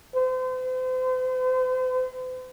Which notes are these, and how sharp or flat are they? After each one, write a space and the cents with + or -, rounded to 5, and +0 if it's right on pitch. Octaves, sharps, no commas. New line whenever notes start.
C5 -40